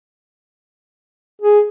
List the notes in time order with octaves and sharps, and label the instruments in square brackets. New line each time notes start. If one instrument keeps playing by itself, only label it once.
[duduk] G#4